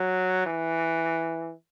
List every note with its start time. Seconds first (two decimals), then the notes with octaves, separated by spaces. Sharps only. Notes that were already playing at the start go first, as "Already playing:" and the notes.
Already playing: F#3
0.46 E3